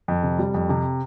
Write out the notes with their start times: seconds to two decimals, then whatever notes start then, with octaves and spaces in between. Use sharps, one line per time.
0.08 F2
0.23 C3
0.39 G3
0.54 F2
0.69 C3